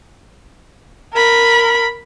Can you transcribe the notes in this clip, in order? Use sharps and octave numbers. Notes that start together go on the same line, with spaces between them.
A#4 B5